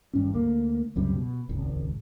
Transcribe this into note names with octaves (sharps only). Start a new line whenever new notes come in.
G#1 G2 C#4
D2 A#3
C#2 F#2 C3 G3
B2
D#1 G#1 C#2